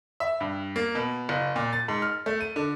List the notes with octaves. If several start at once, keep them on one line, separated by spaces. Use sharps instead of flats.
E5
G2
A#3
B2
F#1
A#2
A6
G#2
F6
A3
D#7
D3